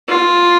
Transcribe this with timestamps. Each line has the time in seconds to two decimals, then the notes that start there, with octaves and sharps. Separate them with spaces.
0.09 F4